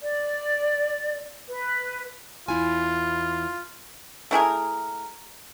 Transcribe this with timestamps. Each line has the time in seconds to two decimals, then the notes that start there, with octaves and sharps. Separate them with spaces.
0.01 D5
1.48 B4
2.48 E2 E4 F4 G#5
4.31 A3 E4 G#4 A#4